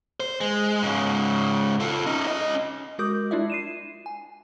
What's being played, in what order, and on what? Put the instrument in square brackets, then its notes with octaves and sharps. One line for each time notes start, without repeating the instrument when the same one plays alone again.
[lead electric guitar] C5
G#3
G#2 C#3
F4 A4
C#4 D#4
C#4 D#5
[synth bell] G#3 F#4 A#4 D6 D#6 G6
G#3 D4 E4 F4 D5 E5
C7 D#7 E7
G#5